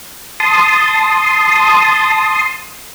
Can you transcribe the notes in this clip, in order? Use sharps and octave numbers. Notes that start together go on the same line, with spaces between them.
A5 C6 D#6